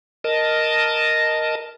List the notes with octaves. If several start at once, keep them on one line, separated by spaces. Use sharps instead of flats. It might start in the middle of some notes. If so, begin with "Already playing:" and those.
A#4 D#5 A5